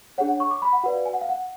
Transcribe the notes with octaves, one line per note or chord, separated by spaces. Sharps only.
D4 G#4 C#5 F#5
F#5
C#6
D6
B5
F#5
F#4 B4 D5 F#5
F5
G#5
F#5
F5
F#5